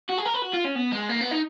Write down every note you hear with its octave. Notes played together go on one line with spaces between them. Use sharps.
F#4
G#4
A#4
B4
F#4
F4
C#4
B3
G#3
A#3
B3
D#4